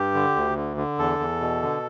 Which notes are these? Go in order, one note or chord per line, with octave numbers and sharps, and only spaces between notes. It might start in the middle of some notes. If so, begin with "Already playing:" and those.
Already playing: G2 G4
D3
D2
D3
D3
E2 A4
E2
B2
D3